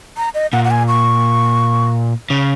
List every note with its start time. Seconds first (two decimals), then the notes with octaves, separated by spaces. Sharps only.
0.17 A#5
0.34 D#5
0.52 A#2 F#5
0.65 F#5
0.71 G#5
0.88 C#6
2.30 C#3